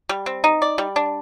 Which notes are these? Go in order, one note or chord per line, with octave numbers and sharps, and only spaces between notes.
G3
C4
D#4
D5
G3
D4